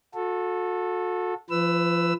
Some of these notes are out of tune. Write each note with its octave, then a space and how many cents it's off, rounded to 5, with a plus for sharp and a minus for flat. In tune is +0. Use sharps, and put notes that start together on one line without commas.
F#4 -35 A4 +0
F3 -30 B4 +15 E6 +5